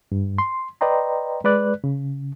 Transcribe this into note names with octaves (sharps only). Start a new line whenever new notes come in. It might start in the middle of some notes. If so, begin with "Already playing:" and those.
G2
C6
B4 D5 D#5 G5 A#5 C6
G#3 B4 D5 F#6
C#3